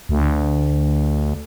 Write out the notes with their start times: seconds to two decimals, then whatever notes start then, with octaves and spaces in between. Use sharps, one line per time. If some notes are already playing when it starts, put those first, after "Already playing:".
0.09 D2